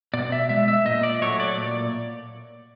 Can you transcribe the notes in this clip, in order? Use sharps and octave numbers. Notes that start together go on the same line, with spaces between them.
B2 D5
E5
G#3 E5
E5
A#2 D#5
D5
F#3 A3 C#5
D5
A#2 D5